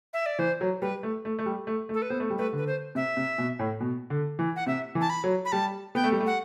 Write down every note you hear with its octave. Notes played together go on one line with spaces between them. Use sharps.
E5
D5
E3 C5
F#3
G3 B4
A3
A3
A3
G3
A3
A3
A4
B4
B3 C5
A3
G3
A3 B4
D3 B4
C5
C3 E5
C3
B2
A2
B2
D3
E3
F#5
C3 E5
E3
A5
B5
F#3
B5
G3 A5
B3 G5
A3
G3
A3
F#5